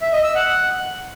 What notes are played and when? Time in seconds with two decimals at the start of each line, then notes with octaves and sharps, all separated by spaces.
0.01 E5
0.12 D#5
0.24 E6
0.35 F#5